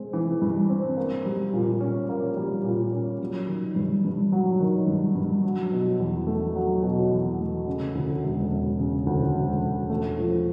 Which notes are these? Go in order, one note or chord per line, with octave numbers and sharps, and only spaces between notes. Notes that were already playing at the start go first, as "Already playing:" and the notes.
Already playing: G#3 C4
E3
G2
C4
A#3
G3
A#2
C#4
A#3
G3
A#2
C#4
F#3
D#3
G2
G2
F#3
D#3
G2
G2
F#3
B2
E2
A3
F#3
B2
E2
A3
C#3
D2
E1
E1
C#3
D2
E1
E1
A3
F3